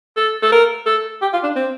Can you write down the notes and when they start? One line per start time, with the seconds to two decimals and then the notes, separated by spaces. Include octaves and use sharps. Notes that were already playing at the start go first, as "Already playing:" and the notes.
0.17 A4
0.43 A4
0.52 A#4
0.86 A4
1.22 G4
1.33 F4
1.43 D4
1.56 C4